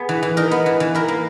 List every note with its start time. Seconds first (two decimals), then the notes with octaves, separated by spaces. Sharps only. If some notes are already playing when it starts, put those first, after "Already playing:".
Already playing: B3 G#4
0.09 E3
0.23 E3
0.37 D#4 A#4
0.51 B3
0.66 E3
0.80 E3
0.95 E4 A#4
1.08 A#3